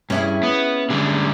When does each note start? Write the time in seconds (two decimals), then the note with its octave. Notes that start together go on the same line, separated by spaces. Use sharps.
0.10 G2 C#4 E4 G#4
0.43 B3
0.90 D3 G3 G#3